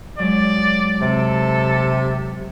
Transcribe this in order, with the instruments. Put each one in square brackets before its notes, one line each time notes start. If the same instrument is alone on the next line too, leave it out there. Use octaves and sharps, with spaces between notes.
[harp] F#3 G#3 [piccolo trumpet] D5
[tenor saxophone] C3 [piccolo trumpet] A4